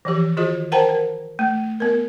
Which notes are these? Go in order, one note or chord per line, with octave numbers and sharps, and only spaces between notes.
E3 F3 G4
D#3 F4 F#4 G#4 D#5
A#4 C5 F#5 G5 A5 A#5
A#4
A3
B3 A#4